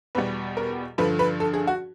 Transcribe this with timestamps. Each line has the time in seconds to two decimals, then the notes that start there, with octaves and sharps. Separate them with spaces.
0.15 E2 B2 G3 B3 B4
0.57 A#4
0.98 G2 D3 F3 B4
1.19 B4
1.40 A4
1.54 G#4
1.67 F#4